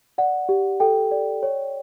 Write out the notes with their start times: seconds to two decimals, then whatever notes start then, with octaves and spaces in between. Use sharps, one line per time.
0.18 D5 F#5
0.49 G4
0.80 A4 G5
1.11 D5
1.43 C#5